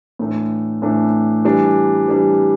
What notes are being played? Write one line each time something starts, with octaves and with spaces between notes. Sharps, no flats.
A2 E3 A3 D4
A2 E3 A3 D4
E3 G3 D4
E3 G3 D4